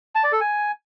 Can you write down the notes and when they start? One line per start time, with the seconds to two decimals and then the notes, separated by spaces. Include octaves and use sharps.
0.15 A5
0.24 D5
0.32 A4
0.41 G#5